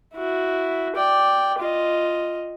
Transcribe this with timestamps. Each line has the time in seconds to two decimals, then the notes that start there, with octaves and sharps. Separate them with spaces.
0.14 E4 F#4
0.95 D5 G5
1.59 F4 D#5